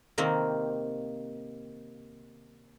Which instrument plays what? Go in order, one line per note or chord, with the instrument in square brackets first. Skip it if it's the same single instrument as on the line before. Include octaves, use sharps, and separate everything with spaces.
[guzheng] C3 D#3 A#3 C4